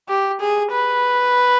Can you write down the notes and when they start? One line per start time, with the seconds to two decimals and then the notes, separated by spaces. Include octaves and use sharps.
0.09 G4
0.40 G#4
0.72 B4